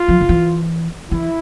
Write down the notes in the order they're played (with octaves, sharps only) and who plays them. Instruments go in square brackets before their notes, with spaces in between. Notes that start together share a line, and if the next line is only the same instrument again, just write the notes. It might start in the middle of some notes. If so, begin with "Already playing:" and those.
Already playing: [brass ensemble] F4
[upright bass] F3
D#3
E3
[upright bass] E3 [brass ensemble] E4